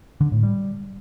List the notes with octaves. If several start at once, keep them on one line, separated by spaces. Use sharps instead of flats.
D3
A2
G3